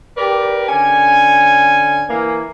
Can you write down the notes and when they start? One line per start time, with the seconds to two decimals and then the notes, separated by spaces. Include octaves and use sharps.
0.17 G4 A#4 B4 D5
0.69 D3 C#4 G#5
2.10 E3 A#3